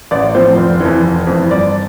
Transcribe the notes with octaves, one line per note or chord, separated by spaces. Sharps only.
A1 D5
A2 F3 C4 C5
F1
F2 E3
F1
F2 E3
G1 D5